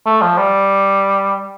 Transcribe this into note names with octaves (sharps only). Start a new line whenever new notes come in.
A3
F3
G3